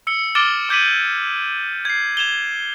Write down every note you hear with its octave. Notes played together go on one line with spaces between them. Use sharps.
E6 C#7 G7
D6 F6 A6 D7 E7 G7
D6 G6 G#6 B6 D#7 F#7
G#6 C7
G#6 E7 F7 G7